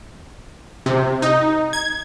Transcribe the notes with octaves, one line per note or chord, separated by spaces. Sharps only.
C3
D#4
G#6